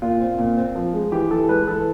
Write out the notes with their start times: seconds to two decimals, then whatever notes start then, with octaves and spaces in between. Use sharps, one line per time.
0.02 A#2 F4
0.20 C4
0.39 A#2
0.57 C4
0.75 F3
0.93 G#3
1.12 E3 G4
1.30 E3 A4
1.49 G#3 B4
1.67 E3 A4